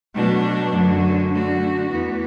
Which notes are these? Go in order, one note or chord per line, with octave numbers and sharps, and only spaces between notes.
B2 F#3 A3 D4
F#2 D3 F#3
D3 A3 F#4
E2 E3 B3